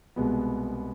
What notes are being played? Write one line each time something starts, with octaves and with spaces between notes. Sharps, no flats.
C2 B2 G#3 B3